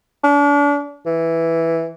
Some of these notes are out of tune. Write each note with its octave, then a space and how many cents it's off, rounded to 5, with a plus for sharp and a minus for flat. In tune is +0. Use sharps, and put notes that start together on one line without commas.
D4 -35
E3 +0